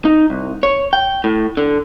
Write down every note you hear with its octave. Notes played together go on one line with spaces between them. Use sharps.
D#4
C2
C#5
G5
A2
D3